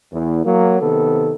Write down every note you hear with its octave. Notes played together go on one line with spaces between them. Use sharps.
E2
F#3 A#3
C3 D#3 B3 A4